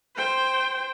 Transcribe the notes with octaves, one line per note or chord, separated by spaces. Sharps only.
C5 G5